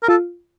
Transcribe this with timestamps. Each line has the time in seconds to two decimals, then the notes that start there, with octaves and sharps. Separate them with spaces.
0.03 A#4
0.08 F4 A4